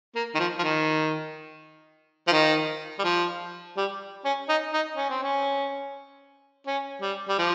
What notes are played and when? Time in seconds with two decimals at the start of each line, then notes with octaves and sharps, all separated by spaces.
0.15 A#3
0.35 D#3
0.39 F3
0.59 F3
0.63 D#3
2.27 F3
2.32 D#3
2.99 G3
3.04 F3
3.77 G3
4.25 C#4
4.49 D#4
4.73 D#4
4.97 C#4
5.10 C4
5.23 C#4
6.66 C#4
7.02 G3
7.29 G3
7.38 F3